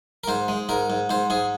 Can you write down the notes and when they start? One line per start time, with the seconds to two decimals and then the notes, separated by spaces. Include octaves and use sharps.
0.24 A#4
0.28 G#2 C5
0.48 G#3
0.69 G#2 A#4
0.90 G#2
1.10 G#2 C5
1.30 G#2 G#4